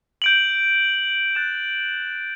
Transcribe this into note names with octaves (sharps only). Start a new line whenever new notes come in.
G6 D7 F#7
F#6 A6 E7